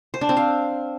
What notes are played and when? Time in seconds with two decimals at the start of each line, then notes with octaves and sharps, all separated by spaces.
0.14 C5
0.21 D4
0.29 C4
0.37 F5